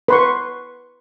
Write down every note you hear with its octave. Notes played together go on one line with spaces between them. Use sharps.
B4 C6 C#6